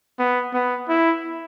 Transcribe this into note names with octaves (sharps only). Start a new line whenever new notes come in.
B3
B3
E4